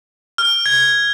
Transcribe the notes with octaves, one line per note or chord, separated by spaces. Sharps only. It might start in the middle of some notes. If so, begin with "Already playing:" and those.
F6
G#6